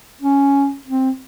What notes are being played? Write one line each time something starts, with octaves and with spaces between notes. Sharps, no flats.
C#4
C4